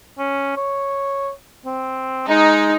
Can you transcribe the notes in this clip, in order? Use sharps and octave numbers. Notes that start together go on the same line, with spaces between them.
C#4
C#5
C4
G#3 D#4